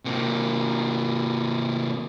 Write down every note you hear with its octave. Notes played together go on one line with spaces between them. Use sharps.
C3 A#3